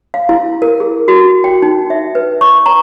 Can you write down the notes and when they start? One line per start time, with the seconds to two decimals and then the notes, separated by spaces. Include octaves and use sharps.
0.14 F5
0.29 E4
0.62 A#4
0.80 G#4
1.08 F#4
1.44 G5
1.62 D#4
1.90 E5
2.15 B4
2.41 C#6
2.66 A#5